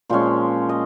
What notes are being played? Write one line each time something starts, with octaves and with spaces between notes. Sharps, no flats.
A#2 F3 G#3 C#4 C5
D#5